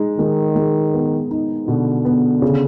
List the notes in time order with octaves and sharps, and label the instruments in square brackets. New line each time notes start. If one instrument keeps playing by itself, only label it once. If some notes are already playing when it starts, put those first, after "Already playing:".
Already playing: [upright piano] G#3 D#4
[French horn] D#3 [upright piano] G#3
[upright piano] G#3
B3
D#4
[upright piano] B2 [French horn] D3
[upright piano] B3
C#3